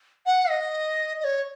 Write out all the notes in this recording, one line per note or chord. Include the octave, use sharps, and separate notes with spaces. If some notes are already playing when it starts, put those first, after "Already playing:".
F#5
D#5
D#5
C#5